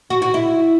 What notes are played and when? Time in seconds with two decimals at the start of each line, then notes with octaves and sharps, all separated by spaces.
0.10 F#4
0.22 F#4
0.34 E4